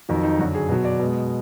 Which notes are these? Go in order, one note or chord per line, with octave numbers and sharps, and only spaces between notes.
F2 D#3 F#3
D#4
F#2 D3 F#3 F#4
G#4
B2 F#3
D5
B2 G#3